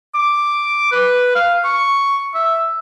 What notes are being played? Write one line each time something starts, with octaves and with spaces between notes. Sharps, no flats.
D6
B4
F5
C#6
E5